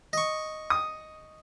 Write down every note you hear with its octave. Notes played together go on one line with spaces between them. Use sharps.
D#5 C#6
D#6